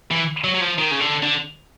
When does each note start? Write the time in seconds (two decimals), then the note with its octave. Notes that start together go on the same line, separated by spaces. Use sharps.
0.11 E3
0.44 F#3
0.54 F#3
0.61 F3
0.78 D#3
0.91 C#3
1.00 D3
1.23 D3